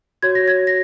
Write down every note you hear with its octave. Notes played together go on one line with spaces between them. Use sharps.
F#4 C#5 G#6
A#6
G#6
A#6